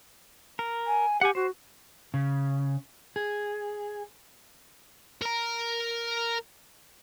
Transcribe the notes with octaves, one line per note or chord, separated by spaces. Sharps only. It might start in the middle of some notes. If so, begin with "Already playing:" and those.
A#4
G#5
G4 F#5 G#5
F#4 C5
C#3
G#4
A#4 A#5